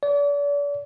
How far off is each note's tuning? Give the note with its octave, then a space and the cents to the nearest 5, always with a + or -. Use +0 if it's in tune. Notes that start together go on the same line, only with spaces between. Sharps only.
D5 -40